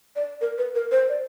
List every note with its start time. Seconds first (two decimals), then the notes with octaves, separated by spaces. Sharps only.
0.16 D5
0.41 A#4
0.58 B4
0.75 A#4
0.91 C5
1.09 D5